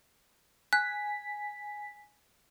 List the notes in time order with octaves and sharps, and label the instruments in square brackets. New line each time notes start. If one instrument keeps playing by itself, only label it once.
[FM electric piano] G#5 B6 [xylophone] F#6